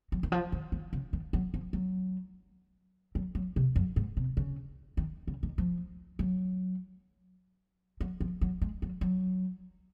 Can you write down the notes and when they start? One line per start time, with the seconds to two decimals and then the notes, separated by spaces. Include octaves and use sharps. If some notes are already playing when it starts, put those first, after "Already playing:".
0.12 F#3
0.23 D#3
0.32 F3
0.52 D#3
0.72 D#3
0.93 C#3
1.13 D#3
1.33 F#3
1.54 F3
1.73 F#3
3.15 F#3
3.35 F#3
3.56 C3
3.76 F#2
3.96 G#2
4.17 C3
4.37 C#3
4.97 D#3
5.28 C#3
5.43 D#3
5.58 F3
6.19 F#3
8.01 F#3
8.20 F3
8.41 F#3
8.62 G#3
8.82 F#3
9.01 F#3